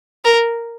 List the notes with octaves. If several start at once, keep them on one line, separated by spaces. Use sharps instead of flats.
A#4